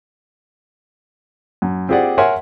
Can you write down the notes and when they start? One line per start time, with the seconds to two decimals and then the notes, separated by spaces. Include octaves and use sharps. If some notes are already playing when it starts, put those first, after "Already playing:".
1.62 F#2
1.89 C4 F4 G4 G#4 D5 F#5
2.18 A#4 C#5 E5 F#5 G#5 C6